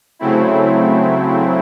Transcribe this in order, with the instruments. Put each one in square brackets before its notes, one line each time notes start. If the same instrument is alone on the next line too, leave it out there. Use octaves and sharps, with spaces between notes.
[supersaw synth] C#3 F#3 A3 C4 E4